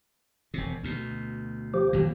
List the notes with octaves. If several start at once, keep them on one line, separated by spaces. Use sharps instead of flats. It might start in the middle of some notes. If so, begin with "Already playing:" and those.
E1 C3
D2 B2
F3 G4
D#2 B2 F#3